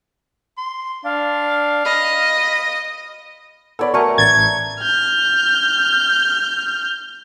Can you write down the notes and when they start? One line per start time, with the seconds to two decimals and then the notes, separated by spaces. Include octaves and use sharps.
0.58 C6
1.04 D4 F5
1.86 D#5 B5
3.79 B3 A4 C#5 D5 B5
3.94 A3 F#4 A#4 G#5 A#5 C#6
4.18 A1 G#6 A6
4.81 F6 G6